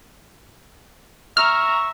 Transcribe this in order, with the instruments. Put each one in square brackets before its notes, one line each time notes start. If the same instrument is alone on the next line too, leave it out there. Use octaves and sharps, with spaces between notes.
[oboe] E5 [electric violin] A#5 [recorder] C#6 [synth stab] F6